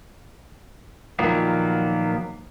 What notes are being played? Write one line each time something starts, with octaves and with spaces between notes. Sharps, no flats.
A#2 D#3 F3 F#3 A#3 B3